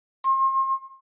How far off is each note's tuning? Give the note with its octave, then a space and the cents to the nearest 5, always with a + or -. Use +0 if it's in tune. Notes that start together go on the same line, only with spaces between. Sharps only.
C6 +40